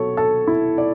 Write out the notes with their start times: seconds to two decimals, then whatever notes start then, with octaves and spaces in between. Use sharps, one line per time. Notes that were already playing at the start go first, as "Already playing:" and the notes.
Already playing: B2 F#3 A4 C#5
0.17 A4
0.47 E4
0.78 D5